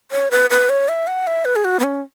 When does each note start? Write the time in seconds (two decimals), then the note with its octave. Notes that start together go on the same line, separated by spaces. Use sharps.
0.11 C#5
0.31 B4
0.50 B4
0.69 C#5
0.88 E5
1.07 F#5
1.27 E5
1.45 B4
1.56 G#4
1.65 F#4
1.80 B3
1.84 C#4